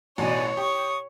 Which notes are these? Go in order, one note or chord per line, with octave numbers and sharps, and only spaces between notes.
A1 B2 D#4 C#5 D5 G#5
G4 C#6 D#6